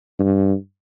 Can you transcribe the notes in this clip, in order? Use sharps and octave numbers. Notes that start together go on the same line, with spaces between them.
G2